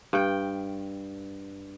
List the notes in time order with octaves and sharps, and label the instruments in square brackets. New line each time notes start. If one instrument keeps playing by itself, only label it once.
[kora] G2 G5